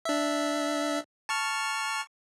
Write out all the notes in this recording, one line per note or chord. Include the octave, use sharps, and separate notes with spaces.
D4 E5
A5 C#6 F6